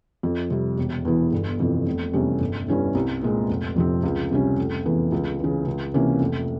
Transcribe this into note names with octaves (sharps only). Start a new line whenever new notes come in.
F2
C3 G3
E1
E2 E3
G1
F2 C3 E3
F1
E2 C3 G3 C#4
G1
G2 G3 C#4 E4
C2
A#2 G#3 C4
F1
F2 C3 F3 C4
C#2
C3 G3 C#4
F1
E2 E3
C#2
C#3 E3
C#2
C3 E3 A#3 C#4
F1